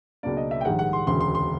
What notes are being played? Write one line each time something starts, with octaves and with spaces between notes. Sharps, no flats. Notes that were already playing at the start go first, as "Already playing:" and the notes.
C#2 B2 F#3 A#3 D4 D5
D#5
E5
G5
A#1 G#2 D#3 G3 F#5
F#5
C6
E1 D2 C#3 C6
C6
C6